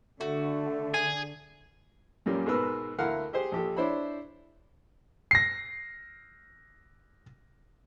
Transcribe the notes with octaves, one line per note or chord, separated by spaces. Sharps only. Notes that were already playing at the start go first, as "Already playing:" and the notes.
D3 A3 F#4
G#4 G#5
F#2 A#2 G3 A#3 C#4
G#2 B2 G#3 A#4 B4 E6
D2 E4 A#4 F5 F#5
G4 G#4 C5
A#1 G4 A4
D4 E4 C5 C#5 B5
A#6 C7